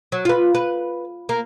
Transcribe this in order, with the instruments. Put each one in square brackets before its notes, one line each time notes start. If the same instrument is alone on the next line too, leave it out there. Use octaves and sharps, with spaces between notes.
[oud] F#3
F4 B4
B4
A#3